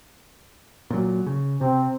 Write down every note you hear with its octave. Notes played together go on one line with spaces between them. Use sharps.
A#2 F#3
C#3
C3 C4